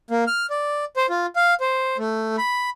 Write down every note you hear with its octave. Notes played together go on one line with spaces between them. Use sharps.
A#3
F6
D5
C5
F4
F5
C5
A3
B5